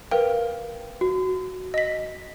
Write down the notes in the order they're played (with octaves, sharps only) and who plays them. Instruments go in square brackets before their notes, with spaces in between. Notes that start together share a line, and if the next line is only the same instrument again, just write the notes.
[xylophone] A#4 G5 [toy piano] B4 F5
[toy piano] F#4
[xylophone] D#5 B6